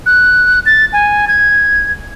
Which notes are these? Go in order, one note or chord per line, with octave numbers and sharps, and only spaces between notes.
F#6
A6
G#5
G#6